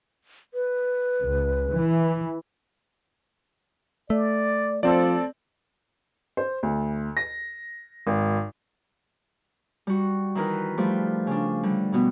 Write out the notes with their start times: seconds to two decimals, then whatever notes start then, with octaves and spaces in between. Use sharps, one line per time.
0.54 B4
1.23 C#2
1.73 E3
4.10 A3 D5
4.83 F3 C4 A4 D5
6.37 C5
6.63 D2
7.17 A#6
8.07 G#1
9.87 G3 F#4
10.35 D#3 E3 D#4 A#4 B4
10.77 F3 G3 A3 G4
11.27 C#3 D4
11.63 D3 G3
11.92 G2 B2 B3